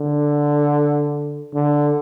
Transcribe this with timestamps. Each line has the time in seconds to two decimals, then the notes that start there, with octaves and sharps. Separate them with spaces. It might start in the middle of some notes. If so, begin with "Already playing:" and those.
Already playing: D3
1.54 D3